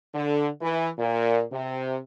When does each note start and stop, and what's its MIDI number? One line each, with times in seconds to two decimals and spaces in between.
0.14 0.48 50
0.61 0.89 52
0.98 1.42 46
1.52 1.97 48